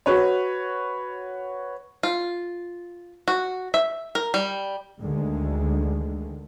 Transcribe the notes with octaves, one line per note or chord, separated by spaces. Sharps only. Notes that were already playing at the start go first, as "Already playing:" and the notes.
F#4 B4 C#5
F4
F#4
E5
A#4
G3
D2 D3 D#3 G#3